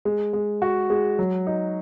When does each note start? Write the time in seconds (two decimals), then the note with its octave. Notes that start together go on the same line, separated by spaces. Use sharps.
0.05 G#3
0.33 G#3
0.62 F#4
0.90 G#3
1.19 F#3
1.47 D#4